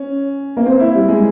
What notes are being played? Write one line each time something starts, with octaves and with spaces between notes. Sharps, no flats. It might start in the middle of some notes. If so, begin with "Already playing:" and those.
Already playing: C#4
A#3
C4
E4
G3
G#3